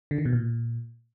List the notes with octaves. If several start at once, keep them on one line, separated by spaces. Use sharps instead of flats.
D3
D#3
B2
A#2